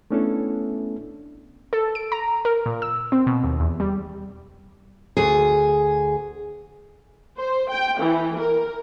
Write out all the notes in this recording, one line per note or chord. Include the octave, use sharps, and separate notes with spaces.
A3 B3 C#4 D4 E4 A4
A4
D7
A#5
A#4
A#2
E6
C4
B2
D#2
E2
G3
D2 G#4
C5
G5
E3
A#4